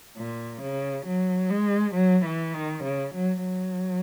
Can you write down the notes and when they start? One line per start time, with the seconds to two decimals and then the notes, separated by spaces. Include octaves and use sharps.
0.17 A#2
0.62 C#3
1.06 F#3
1.50 G#3
1.95 F#3
2.25 E3
2.55 D#3
2.84 C#3
3.15 F#3
3.44 F#3